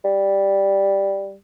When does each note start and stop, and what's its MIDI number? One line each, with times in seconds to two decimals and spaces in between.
0.05 1.35 55